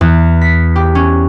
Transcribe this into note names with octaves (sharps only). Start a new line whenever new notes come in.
E2
B6
G4
C#4